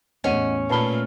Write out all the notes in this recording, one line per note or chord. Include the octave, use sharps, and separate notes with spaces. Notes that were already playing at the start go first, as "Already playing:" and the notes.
A1 E2 C#4 D#5 F#5 D#7
A#2 A3 B4 A5 B5 F6 C7 G7